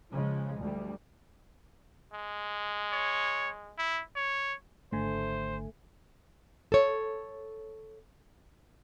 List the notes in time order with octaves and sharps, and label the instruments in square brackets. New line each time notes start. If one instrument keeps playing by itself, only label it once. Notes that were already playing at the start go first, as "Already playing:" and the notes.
[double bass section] C#3 F3 G#3
D2 G3
[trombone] G#3
[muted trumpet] C#5
E4
C#5
[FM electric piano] G#1 D3 G#5 [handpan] A3 [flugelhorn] C5
[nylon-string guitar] A4 C#5